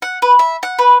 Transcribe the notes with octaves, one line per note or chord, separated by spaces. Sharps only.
F#5
B4
E5
F#5
B4